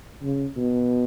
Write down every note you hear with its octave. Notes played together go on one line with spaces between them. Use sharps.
C#3
B2